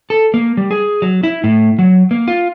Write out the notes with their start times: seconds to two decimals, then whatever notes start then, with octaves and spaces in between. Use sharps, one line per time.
0.10 A4
0.34 A#3
0.57 G3
0.71 G#4
1.02 F#3
1.23 E4
1.44 A2
1.79 F#3
2.11 A#3
2.28 F4